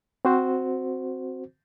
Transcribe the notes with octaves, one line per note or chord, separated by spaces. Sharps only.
C4 F#4 C5